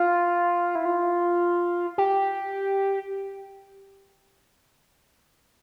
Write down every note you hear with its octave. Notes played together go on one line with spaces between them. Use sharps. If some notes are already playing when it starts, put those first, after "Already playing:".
Already playing: F4
E4
F4
G4